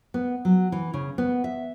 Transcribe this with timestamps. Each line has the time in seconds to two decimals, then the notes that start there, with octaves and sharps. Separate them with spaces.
0.14 B3
0.45 F#3
0.72 E3
0.94 C#3
1.18 B3
1.44 E5